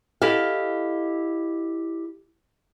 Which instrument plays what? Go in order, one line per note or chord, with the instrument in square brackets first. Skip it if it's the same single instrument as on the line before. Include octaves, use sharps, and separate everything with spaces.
[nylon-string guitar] E4 G4 A4 D#5 F5